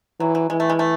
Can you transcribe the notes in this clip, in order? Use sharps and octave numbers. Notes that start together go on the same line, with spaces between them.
E3 F#3
F#3
E3 G#3
A3
G#3
A3